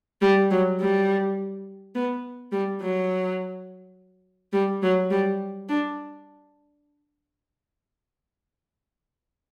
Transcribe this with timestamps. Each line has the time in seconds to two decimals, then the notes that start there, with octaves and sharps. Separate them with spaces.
0.22 G3
0.51 F#3
0.80 G3
1.95 B3
2.52 G3
2.81 F#3
4.53 G3
4.82 F#3
5.11 G3
5.69 D4